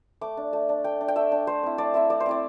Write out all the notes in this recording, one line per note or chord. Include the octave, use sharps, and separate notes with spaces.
A3 D6
D4
A3
D4
A3 G5
D4
G5
A3 E5
D4
A3 C5
C4 E4
A3 D5
C4 E4 E5
A3 D5
C5
C4 E4 D5